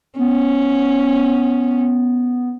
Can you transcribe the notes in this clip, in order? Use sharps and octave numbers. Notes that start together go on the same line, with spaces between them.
B3 C#4